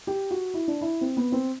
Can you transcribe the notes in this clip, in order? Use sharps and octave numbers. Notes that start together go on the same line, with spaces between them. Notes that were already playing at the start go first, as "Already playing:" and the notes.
G4
F#4
E4
D4
E4
C4
B3
C4